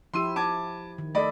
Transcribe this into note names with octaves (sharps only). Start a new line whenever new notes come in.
F3 E4 G4 C6 E6 D#7
A5 D6 G#6
D#3
A3 A4 D5 D#5 B5